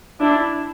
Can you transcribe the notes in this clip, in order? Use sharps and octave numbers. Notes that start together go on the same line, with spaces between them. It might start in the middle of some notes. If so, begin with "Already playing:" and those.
D4 E4